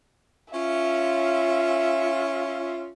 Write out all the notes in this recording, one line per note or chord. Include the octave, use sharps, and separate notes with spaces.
C#4 F4 E5